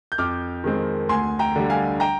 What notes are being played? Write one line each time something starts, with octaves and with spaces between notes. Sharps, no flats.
G6
F2 D6 F6
D#3 G#3 C4
D2 G#5 C6
G5 A#5
D3 G3
F5 G#5
G5 A#5